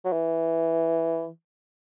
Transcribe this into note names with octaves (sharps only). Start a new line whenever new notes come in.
F#3
E3